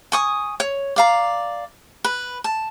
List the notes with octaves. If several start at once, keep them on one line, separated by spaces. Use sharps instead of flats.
G#5 C#6 D#6
C#5
D5 F5 A#5
B4
A5